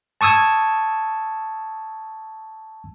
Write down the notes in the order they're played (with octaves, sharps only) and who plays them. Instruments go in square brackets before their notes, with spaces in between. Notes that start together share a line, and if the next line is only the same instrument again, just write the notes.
[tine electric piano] A5 C#6 D#6 E6 G#6